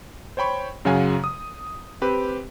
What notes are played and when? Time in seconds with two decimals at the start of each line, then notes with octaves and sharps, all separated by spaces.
0.37 C5 C#5 G5 B5 C#6
0.85 F#2 C#3 F#3 F5 F#5 G#5
1.24 D#6
2.02 C4 G4 B4